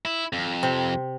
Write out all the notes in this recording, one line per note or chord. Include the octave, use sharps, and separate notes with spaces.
E4
F2
C3